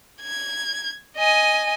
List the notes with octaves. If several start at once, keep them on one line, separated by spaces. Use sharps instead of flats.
G#6
D#5 G#5